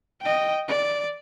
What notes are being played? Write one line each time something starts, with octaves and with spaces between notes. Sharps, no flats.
D#5 G5
D5